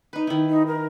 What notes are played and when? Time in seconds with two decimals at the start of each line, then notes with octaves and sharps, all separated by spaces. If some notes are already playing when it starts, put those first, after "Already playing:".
0.13 D#4 B4
0.27 D#3 E4
0.49 D#4
0.66 A#4